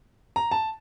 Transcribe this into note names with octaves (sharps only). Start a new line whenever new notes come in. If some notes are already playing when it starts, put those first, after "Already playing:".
A#5
A5